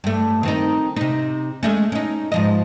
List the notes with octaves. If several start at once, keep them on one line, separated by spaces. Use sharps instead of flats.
G2 A3
D#3 C4 D#4
C3 D#4
G#3 A3 C#4
C#4 D#4
G#2 F3 D#5